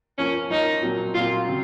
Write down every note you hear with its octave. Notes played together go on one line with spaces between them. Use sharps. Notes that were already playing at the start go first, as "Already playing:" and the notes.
F3 A#3 C#4 F4 A#4 C#5
F3 A#3 D#4 F4 A#4 C#5
A#2 F#3 C4
A#2 F#3 C4 F4
C#3 F#3 C4